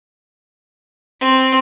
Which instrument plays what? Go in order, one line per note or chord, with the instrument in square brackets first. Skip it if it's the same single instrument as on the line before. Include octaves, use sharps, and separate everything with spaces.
[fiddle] C4